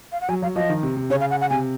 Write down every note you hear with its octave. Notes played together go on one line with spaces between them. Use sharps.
F5
F#5
F#3 G#5
F#3 F5
F3 D#5
D#3
C3
C3
C#3 C#5
F5
F#5
F#5
C3 G#5